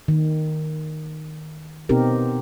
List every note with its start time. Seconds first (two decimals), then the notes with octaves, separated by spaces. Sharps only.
0.08 D#3
1.89 B2 B3 C4 D#4 G4 A#4